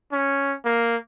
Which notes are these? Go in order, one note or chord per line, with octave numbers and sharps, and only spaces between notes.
C#4
A#3